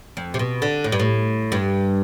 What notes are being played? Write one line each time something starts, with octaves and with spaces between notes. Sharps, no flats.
F2
C3
B2
D3
A2
G2
A2
G2